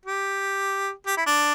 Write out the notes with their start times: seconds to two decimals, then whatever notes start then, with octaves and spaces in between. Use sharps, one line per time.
0.06 G4
1.07 G4
1.17 E4
1.26 D4